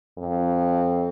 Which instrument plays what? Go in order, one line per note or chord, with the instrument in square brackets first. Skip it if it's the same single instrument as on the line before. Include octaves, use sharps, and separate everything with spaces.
[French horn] F2